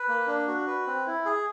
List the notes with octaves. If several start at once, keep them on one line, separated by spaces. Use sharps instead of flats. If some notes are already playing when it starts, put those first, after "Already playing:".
Already playing: B4
A#3
D4
F#4
B4
C4
E4
G#4